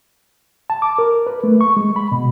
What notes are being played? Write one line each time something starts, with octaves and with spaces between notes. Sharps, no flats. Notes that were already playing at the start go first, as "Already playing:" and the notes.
A5
D6
A#4
B4
A3
C#6
G#3
B5
B2